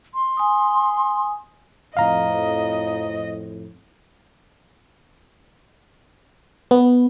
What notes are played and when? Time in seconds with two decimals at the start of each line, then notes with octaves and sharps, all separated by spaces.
0.14 C6
0.37 G#5 D#6
1.97 F2 A2 D#5 F5 A#5
6.71 B3